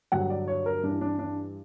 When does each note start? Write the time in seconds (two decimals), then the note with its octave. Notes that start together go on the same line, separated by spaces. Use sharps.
0.12 G2 D3 F#3 F#5
0.30 D5
0.48 C#5
0.66 A#4
0.83 G2 E3 D4
1.01 D4
1.19 D4